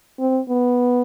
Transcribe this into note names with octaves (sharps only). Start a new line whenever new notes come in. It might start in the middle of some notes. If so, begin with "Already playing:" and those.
C4
B3